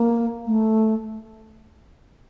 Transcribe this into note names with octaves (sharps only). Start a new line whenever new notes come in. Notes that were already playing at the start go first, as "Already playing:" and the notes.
Already playing: A#3
A3